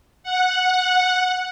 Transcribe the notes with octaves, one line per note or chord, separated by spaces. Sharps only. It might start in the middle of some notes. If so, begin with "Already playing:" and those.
F#5